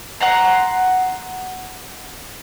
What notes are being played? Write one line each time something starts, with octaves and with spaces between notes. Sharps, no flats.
F#5 A#5 C6